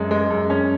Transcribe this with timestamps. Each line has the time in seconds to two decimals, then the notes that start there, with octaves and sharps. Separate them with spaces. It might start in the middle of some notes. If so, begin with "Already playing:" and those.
Already playing: F#2 G#3
0.11 G#3
0.31 F#2
0.50 C#4